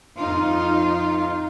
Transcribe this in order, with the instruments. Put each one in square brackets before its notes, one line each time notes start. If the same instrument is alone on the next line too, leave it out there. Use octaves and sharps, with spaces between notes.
[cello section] F2 D#4 F4